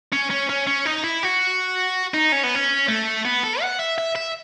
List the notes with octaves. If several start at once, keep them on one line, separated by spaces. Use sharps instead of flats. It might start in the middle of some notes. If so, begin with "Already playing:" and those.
C#4
C#4
C#4
C#4
D#4
E4
F#4
D#4
C#4
B3
C#4
A3
B3
A4
F#5
E5
E5
E5